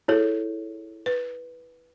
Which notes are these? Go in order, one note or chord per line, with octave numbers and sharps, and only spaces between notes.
E4 G#4 A4 C#5
B4